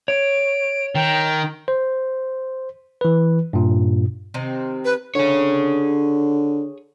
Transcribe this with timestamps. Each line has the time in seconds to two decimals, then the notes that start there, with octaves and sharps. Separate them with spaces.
0.08 C#5 D7
0.95 D#3 G5
1.68 C5
3.01 E3 B4
3.53 G2 A#2
4.34 C3 D#3 C4
4.85 B4
5.15 D3 G#4 C#5